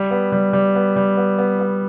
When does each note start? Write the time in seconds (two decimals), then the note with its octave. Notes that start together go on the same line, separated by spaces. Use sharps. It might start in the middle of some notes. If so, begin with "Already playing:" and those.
Already playing: G3
0.11 B3
0.32 G3
0.53 G3
0.75 B3
0.96 G3
1.17 B3
1.38 B3
1.60 B3